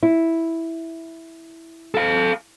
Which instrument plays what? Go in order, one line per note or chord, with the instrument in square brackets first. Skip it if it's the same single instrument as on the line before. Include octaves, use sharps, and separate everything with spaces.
[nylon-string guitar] E4
[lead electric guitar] A4 F5